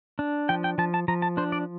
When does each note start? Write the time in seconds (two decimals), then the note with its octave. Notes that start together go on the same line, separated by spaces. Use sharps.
0.19 D4
0.49 F3 G5
0.64 G5
0.78 F3 A5
0.94 A5
1.08 F3 A#5
1.22 A5
1.37 D4 C5
1.52 D5